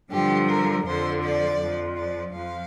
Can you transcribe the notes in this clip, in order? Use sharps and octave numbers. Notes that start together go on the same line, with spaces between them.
G2 D3 F3 G4
A#4
F2 D3 F3 C5
D5
F2 F3
D5
F2 F3 F5